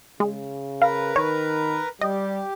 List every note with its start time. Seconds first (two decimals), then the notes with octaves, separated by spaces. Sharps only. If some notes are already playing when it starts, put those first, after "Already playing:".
0.20 C#3 G#3
0.82 A#4 B4 F5 A#5
1.16 D#3 C#5
2.01 G3 G4 D#5